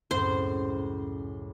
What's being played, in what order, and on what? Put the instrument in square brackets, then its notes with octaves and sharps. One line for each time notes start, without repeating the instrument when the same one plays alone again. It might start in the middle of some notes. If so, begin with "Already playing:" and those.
[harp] C#2 F#2 A2 [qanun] C5